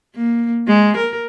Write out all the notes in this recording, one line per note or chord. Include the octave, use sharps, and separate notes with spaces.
A#3
G#3
A#4